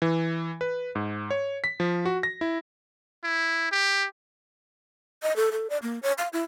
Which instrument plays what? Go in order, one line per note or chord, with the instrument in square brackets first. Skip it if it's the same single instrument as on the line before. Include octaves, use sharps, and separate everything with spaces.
[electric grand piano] E3
B4
G#2
C#5
B6
F3
F#4
A#6
E4
[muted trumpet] E4
G4
[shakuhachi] D#5
A4
A4
D5
A#3
C#5
F5
E4